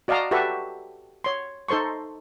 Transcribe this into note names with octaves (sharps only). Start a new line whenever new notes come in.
F#4 D5 D#5 F5 A5 A#5
F#4 G4 A4 B4 E5 C#6
C#5 C6
D#4 A4 C5 C6 C#6